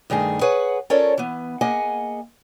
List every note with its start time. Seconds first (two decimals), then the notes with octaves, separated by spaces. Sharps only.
0.10 G2 D#3 A3 G#4
0.41 G#4 B4 C#5 F#5
0.90 C#4 F4 A4 A#4 C#5 D5
1.18 E3 B3
1.61 A#3 G#4 D#5 F#5 G#5